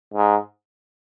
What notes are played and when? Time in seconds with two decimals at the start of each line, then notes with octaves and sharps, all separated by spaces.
0.14 G#2